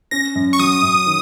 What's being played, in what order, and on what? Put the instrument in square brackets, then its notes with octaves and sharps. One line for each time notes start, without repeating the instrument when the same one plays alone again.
[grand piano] C#4 [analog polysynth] A#6
[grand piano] F#2
[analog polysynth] C#6
[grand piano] F#3 [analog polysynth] D#6
[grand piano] F#2
D#3